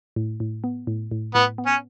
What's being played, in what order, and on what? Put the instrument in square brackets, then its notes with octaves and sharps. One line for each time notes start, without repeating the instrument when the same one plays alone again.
[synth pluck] A2
A2
B3
A2
A2
[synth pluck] A2 [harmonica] B3
[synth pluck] B3
[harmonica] C#4